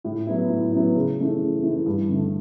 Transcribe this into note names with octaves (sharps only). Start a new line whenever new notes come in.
A2
F#3 B3 E4
A2
F#3 B3 E4
C#3
E3 A3 E4
C#3
E3 A3 E4
G2
D3 A3